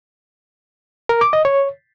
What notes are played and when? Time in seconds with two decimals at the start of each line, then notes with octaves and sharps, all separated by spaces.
1.09 A#4
1.21 D6
1.33 D#5
1.45 C#5